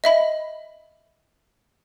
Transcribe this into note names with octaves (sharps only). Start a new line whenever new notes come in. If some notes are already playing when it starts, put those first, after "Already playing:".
D#5 E5 B5